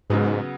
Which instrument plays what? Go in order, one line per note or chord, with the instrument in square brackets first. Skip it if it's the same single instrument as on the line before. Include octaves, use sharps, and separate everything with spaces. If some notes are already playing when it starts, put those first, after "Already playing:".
[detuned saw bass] G#2 [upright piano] C#3 F#3 B3